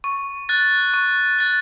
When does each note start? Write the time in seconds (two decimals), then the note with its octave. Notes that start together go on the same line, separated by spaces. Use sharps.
0.04 C#6
0.49 F#6 A6
0.94 C#6
1.39 F#6 A6